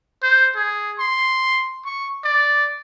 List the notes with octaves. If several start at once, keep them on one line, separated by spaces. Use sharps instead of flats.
C5
G#4
C6
C#6
D5